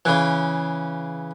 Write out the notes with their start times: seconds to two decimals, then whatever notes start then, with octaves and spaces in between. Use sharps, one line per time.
0.05 C#3 E3